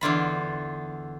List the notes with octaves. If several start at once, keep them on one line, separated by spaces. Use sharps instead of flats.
E2 D3 F4 B5